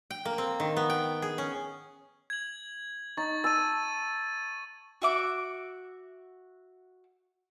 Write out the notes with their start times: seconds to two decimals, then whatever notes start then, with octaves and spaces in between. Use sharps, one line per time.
0.10 G5
0.25 A#3
0.38 C4
0.60 D#3
0.76 B3
0.90 G5
1.22 G#4
1.38 C#4
2.30 G#6 F#7
3.17 D#4 C#6 A6
3.44 A5 E6 A6 D#7
5.02 F#4 E5 D6